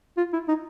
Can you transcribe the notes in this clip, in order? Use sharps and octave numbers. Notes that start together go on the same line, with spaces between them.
F4
E4
D#4